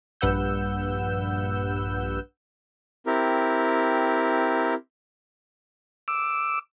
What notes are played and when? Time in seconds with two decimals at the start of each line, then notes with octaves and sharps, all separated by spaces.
0.21 A#1 G2 B4 F#5 E6 G6
3.06 C4 E4 G4 A#4
6.08 D6 E6